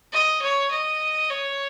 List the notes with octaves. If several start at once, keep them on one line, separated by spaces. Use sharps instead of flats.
D#5
C#5
D#5
C#5